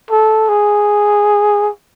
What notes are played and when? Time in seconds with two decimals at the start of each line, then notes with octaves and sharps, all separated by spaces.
0.11 A4
0.49 G#4